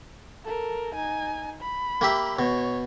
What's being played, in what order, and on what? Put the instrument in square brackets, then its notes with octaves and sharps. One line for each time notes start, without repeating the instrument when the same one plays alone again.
[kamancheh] A4 A#4
D#4 G#5
B5
[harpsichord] A#3 G4 E5
[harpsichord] B2 [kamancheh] C#5